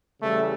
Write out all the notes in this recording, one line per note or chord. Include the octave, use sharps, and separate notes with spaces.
C#3 E3 G3 A3